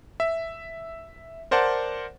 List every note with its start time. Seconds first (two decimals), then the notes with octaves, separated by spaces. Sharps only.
0.20 E5
1.51 A#4 C5 D5 F#5 A5